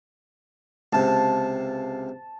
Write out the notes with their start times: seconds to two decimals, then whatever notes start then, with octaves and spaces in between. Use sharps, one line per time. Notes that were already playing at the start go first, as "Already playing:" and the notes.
0.93 C#2 C3 A5